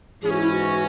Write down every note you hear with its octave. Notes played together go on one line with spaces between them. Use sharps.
G#2 E3 C#4 G#4
F#4
E4
F#4